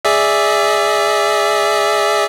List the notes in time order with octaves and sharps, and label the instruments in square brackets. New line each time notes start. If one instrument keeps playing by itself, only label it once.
[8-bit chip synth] G#4 D5 E5